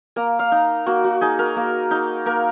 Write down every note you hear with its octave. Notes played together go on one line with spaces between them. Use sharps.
A#3 A#5
F5
D#4
A#3 F#4
F#4
D#4 G#4
A#4
A#3
D#4
A#3 A#4